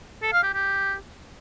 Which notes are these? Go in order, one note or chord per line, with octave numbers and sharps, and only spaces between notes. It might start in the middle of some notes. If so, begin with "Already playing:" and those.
A4
F5
G4
G4